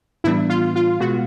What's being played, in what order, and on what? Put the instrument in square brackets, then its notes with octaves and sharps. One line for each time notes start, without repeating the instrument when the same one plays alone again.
[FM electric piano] A2 E3 G3 B3 D4 [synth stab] E4
[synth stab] F4
F4
[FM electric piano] B2 G#3 B3 [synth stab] F#4